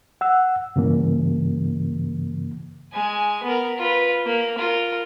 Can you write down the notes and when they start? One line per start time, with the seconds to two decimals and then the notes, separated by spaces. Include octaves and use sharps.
0.21 F#5 E6
0.76 G2 C#3 E3 A#3
2.92 G#3 G#5
3.43 B3 A#4
3.78 F4 B4
4.26 A#3
4.58 F4 A#4